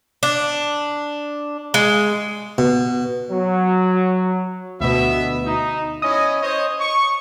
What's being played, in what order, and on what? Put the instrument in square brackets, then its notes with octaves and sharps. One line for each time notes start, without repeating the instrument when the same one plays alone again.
[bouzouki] D4
G#3
[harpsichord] B2
[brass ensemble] F#3
[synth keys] D2 B2 [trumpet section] B3 E5
[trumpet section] D#4
[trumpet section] C#4 E4 D#5 [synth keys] D#6
[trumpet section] C5 C#5 D#5
C#6